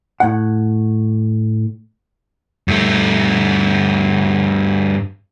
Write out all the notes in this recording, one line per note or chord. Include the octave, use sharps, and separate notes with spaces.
A2 F#5
G2 A3